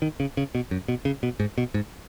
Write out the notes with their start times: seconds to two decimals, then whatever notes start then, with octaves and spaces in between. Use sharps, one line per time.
0.02 D#3
0.20 C#3
0.37 C#3
0.55 B2
0.71 F#2
0.88 B2
1.05 C#3
1.23 B2
1.40 G#2
1.58 B2
1.74 G#2